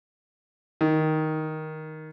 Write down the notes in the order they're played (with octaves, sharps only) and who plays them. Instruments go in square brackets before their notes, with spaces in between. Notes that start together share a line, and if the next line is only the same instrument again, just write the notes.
[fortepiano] D#3